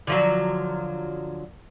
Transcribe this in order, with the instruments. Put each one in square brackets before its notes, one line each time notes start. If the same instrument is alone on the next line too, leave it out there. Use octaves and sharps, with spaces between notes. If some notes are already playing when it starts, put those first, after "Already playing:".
[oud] D3 F3 F#3